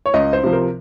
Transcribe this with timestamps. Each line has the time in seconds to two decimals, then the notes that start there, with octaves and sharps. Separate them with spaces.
0.06 C#5
0.14 C#2 D#5
0.33 C5
0.44 C3 F3
0.53 A#4